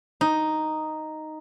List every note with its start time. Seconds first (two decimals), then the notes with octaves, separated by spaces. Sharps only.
0.21 D#4